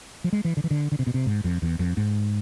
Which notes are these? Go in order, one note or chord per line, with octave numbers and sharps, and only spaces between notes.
F3
G#3
E3
D3
E3
D3
D3
C3
B2
C3
G#2
F2
E2
F2
G#2